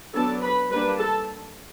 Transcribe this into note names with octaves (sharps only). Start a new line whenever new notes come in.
F#3 B3 D4 A4 A5
B4 B5
G3 A#3 D4 B4 B5
A4 A5